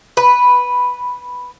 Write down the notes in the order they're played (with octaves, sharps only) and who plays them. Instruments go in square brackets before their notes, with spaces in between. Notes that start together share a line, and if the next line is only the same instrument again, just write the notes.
[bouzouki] B4